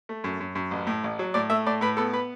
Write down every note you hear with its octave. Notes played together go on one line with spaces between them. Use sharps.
A3
F#2
F#2
F#2
A1
A2
A1
F#3
A2 D5
A3 E5
A2 D5
A2 B4
B3 A4
B4